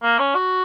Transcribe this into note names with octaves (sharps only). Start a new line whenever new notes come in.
A#3
C#4
F#4